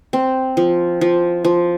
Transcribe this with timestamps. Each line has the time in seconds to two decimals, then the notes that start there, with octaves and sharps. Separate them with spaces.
0.13 C4
0.57 F3
1.01 F3
1.44 F3